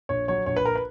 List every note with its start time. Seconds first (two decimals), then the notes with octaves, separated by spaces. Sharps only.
0.09 A#1 C#5
0.28 F#3 C#5
0.46 A#1 C#5
0.56 B4
0.65 A#4
0.76 B4